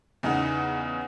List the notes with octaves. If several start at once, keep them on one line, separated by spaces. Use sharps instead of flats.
E2 C#3 D#4 F#5